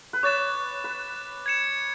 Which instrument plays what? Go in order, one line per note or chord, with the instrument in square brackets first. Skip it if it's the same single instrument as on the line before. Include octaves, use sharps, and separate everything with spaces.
[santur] B4
[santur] C#5 [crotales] D6 F#6 A6 E7
[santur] B4
[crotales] G#6 C#7 E7